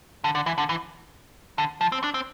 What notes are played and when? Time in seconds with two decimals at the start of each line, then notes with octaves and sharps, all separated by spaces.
0.24 D3
0.35 D3
0.46 E3
0.58 D3
0.69 E3
1.58 D3
1.81 F3
1.92 C4
2.04 D4
2.14 C4